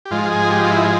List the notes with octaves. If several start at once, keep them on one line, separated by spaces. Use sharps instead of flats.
G4
G#2 F3 G#3 F4
G#4
G4
F4
E4